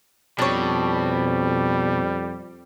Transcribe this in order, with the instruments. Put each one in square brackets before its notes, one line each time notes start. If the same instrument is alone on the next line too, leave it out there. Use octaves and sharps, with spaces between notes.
[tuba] F2 [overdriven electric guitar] B2 [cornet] G3 [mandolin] D4 C#5